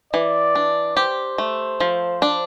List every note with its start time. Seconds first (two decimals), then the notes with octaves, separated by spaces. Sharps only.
0.13 E3 D5
0.55 D4
0.97 G4 C5
1.38 A3
1.80 F3
2.22 D4